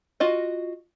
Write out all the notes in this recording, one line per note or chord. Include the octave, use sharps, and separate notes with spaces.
F4 F#4 D#5